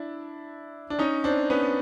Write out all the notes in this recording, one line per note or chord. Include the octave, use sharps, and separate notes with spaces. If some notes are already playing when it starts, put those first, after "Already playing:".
Already playing: D4 E4
D4
C#4 D#4
C4 D4
B3 C#4